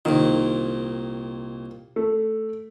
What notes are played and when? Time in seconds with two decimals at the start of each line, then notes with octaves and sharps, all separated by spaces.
0.05 C2 A#2 D#3
1.96 A3